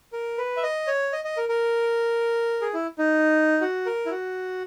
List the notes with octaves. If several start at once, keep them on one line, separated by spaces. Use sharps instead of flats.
A#4
B4
E5
D#5
C#5
D#5
D#5
A#4
A#4
G#4
E4
D#4
F#4
A#4
E4
F#4